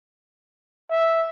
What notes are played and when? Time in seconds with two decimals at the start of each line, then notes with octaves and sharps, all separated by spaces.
0.90 E5